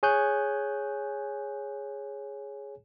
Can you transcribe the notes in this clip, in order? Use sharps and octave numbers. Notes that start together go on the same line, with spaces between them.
G#4 C#5 G#5 F#6 G6